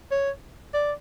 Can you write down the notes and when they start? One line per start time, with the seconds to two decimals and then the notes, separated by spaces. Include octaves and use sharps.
0.11 C#5
0.74 D5